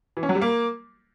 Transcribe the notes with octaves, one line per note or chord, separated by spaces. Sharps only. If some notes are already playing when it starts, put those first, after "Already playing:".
E3
C#4
F#3
G3
A#3